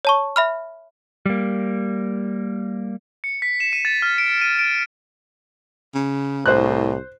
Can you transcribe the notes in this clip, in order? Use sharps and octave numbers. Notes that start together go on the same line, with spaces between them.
C#5 A5 C#6
E5 B5 F6
G3 A#3
C#7
B6
E7
D#7
A6
F6
D7
D#7
D7
C#3
C2 A2 C5 F#6